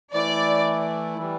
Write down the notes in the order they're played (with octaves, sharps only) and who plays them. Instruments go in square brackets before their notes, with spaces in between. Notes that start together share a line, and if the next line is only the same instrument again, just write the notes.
[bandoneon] E3 A3 E4 [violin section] D5
[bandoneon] E3 G3